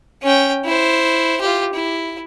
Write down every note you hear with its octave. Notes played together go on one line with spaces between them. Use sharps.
C#4 G5
E4 C5
F4 G4
E4